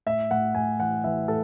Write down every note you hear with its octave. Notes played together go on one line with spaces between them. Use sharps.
A2 E5
A2 F#5
A2 G#5
E3 F#5
E3 E5
A2 A4